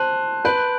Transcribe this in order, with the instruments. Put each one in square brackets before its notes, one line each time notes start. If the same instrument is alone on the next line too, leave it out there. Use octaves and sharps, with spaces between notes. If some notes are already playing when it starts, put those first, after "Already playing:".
Already playing: [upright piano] C5 [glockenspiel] A5 C6 F#6
[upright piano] B4 [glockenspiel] G6 D7 F#7